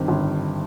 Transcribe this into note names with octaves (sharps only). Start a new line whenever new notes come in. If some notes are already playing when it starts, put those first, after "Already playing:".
Already playing: G2 D#3 C4 G4
G1